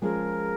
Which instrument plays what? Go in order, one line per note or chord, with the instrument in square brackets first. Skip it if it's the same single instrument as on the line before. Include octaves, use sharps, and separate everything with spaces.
[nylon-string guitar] F3 G#3 C#4 G#4 C5 [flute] A#4